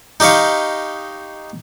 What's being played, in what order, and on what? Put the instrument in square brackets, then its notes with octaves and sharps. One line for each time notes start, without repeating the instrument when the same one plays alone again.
[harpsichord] D#4 G4 D#5 F5 C#6